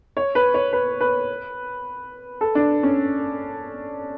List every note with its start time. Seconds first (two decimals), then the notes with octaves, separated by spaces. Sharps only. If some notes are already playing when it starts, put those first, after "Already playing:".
0.17 C#5
0.35 B4
0.54 C#5
0.73 B4
1.00 B4
2.41 A4
2.55 D4
2.83 C#4